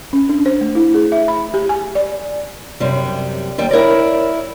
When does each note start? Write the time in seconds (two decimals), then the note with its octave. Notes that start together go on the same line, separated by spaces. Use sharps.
0.13 C#4
0.29 D4
0.46 C5
0.61 A3
0.75 E4
0.94 G#4
1.12 E5
1.28 B5
1.54 G4
1.69 G#5
1.95 D5
2.80 F#2 C3 G3
3.58 D#2 G3 G5
3.71 E4 A#4 C#5 D5